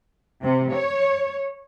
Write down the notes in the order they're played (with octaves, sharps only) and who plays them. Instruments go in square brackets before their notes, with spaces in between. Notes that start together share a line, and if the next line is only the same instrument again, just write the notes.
[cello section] C3
C#5